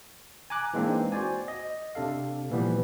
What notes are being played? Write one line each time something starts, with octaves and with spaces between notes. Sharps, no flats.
G#5 A#5 D6 F#6
E3 G#3 A#3 C4 D4 D#4
F#4 C5 D5 G#5
D#5
C3 D4 A4 F5
A#2 E3 F3 G3 B3